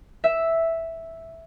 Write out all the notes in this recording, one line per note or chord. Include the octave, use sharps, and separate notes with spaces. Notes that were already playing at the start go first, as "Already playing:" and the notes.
E5